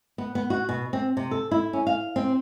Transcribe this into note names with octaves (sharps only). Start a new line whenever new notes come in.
B3
B3
F#4
B2
C4
C3
A4
E4
C#4
F5
C4